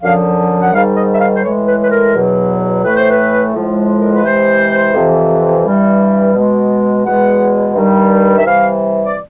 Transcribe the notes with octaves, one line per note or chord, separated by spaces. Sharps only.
F#2 D3 F3 F5
F#5
G#2 D#3 G3 F5
D#5
E5
F5
C5
A2 E3 G#3 C#5
B4
B4
A#4
E2 B2 F#3
A2 E3 A3 B4
C5
B4
A2 F3 G#3
A#4
B4
C3 E3 G#3 C5
F2 C3 E3
G2 E3 G3
B2 G#3
E2 B2 G#3 F#5
G2 D#3 G3
E5
C3 E3 G3 F5
D5